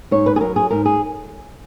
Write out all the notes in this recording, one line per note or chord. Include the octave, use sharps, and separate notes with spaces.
G#2 C#5
B4
G#4
F#3 A#4
G#4
G#2 A#4
G#4